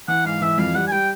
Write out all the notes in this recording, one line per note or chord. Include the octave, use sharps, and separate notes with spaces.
E3 F#5
G#2 F5
E3 E5
F2 F5
G3 F#5
G#5
G3 G5